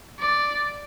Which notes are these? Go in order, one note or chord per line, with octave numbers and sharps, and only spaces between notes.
D5